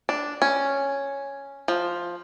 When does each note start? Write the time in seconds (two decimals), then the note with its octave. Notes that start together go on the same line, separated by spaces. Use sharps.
0.09 D4
0.42 C#4
1.68 F3